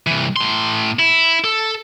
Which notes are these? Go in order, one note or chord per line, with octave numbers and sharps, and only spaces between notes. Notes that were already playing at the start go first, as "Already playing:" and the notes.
C2 E3
A2 C6
E4
A4